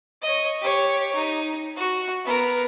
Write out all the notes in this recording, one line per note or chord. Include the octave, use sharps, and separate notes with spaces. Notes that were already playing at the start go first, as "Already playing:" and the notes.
C#5 D#5
G4 C#5
D#4
F#4
B3 A#4